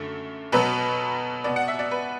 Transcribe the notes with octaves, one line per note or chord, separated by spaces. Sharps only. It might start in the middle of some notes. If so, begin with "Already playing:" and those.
Already playing: F#2 D3 A3
B2 F#3 B3 B4
B2 B3 D5
F#5
E5
D5
B4